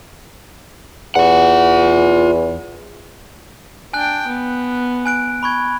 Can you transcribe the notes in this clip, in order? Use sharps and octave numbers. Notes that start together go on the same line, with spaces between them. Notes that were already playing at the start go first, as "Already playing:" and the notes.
E2 F4 F#5
D4 G5 G#5 F#6
B3
G#5 F#6 D7
B5 C#6 G#6